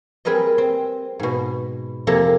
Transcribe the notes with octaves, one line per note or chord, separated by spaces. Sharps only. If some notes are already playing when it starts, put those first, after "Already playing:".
G3 C4 G#4 A#4 B4 D#5
C4
G#2 B2
F2 C3 A#3 G#4 A4 A#5